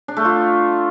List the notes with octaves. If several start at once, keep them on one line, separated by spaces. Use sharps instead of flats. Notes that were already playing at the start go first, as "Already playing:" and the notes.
D4
A3
F4